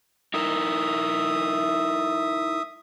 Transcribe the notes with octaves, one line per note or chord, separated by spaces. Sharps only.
D#4 E4 A#4 E5 D#6